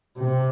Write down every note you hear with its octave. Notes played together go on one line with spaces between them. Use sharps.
C3